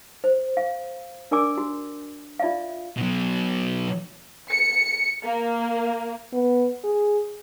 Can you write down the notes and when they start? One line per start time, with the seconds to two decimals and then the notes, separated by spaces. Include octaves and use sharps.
0.24 C5
0.57 F5
1.31 D4 A#4 D5 G#5 D6 E6
1.58 F#4
2.40 F4 D5 E5 F5
2.97 B2 F#3
4.50 C#7
5.24 A#3
6.33 B3
6.84 G#4